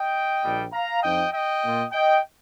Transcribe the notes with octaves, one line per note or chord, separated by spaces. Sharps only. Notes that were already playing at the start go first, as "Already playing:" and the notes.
Already playing: D#5 G5
A#1 A#2 G3
F5 A#5
F2 F3 D#4 D#5 G5
D#5 G5
A#2 A#3 F4
D#5 G5